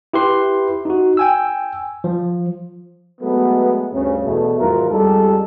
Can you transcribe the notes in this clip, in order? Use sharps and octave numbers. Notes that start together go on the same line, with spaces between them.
E4 G4 B4 C6
D#4 F#4
G5 G#5 E6
F3
F#3 G#3 A3 B3
D2 G2 C#3
E2 B2 A3
E2 G#2 D#3 F#3 F4 A#4
F2 G3 G#3 D#4 G4 A4